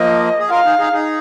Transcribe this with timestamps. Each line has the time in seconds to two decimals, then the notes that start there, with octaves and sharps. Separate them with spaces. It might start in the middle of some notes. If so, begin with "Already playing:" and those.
Already playing: F3 A#3 D#5
0.39 G#4
0.50 F4 A#4 F5
0.65 D#4 G#4
0.79 D#4 G#4
0.93 D#4 G#4